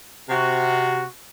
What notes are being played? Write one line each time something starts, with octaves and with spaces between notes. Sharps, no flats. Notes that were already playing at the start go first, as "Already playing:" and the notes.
C3 F#4